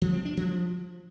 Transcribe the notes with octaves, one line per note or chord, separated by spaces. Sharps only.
F3
C4
D4
F3